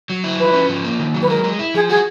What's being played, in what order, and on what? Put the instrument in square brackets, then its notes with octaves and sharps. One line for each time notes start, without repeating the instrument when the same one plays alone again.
[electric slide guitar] F#3
E4
[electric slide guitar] F3 [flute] B4
[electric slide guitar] C#4
F3
A#3
D#3
F#3
[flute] B4
[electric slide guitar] G#3 [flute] A#4
[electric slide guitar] G#3
E4
[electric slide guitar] F3 [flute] G#4
[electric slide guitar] F#4 [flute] G#4